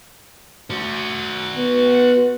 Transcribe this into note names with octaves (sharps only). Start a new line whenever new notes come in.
F#4 C5
B3